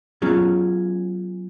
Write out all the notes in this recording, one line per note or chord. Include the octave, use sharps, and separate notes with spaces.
F#3 B3 C#4 F4 G#4